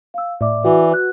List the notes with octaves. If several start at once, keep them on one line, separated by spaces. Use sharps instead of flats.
F5 E6
A2 D5 E5 D6
E3 F#4
B4 F#6